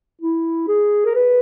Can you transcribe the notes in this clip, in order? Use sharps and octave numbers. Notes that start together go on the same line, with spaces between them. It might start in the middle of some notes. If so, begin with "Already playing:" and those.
E4
G#4
A#4
B4